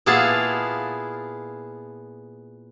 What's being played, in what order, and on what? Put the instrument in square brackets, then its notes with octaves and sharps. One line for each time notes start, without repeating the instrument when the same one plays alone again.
[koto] A#2 B3 E4 G#4 F5 A5